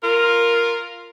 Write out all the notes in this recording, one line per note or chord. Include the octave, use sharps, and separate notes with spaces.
F4 A#4